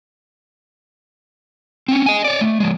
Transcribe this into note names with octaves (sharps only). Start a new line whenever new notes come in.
C4 C#4
D#5 G#5
C#5 D5
A3
F3 G#3